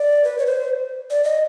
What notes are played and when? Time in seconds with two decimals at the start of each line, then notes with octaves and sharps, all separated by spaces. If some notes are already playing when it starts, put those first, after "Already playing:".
Already playing: D5
0.24 B4
0.38 C#5
0.46 C5
1.10 D5
1.24 D#5